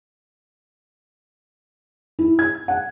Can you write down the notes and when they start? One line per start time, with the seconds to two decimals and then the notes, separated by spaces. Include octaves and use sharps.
2.19 E4
2.39 G#6
2.68 F#5